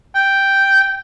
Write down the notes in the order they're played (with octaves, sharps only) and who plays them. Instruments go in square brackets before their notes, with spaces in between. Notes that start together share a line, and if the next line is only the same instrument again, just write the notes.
[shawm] G5